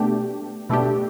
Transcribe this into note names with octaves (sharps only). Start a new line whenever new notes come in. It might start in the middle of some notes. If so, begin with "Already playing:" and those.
Already playing: B2 A3 D4 G4
B2 A3 D4 G4